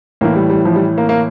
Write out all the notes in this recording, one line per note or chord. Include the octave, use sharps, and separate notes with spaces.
A2 E3 A#3
G3
G3
F3
G3
A#3
A#3